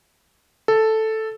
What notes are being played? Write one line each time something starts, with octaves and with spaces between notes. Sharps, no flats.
A4